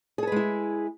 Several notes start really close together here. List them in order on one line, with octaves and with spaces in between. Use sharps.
G#4 A4 B4 G#3 E4